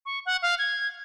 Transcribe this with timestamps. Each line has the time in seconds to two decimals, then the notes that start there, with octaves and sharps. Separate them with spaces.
0.06 C#6
0.26 F#5
0.42 F5
0.59 G#6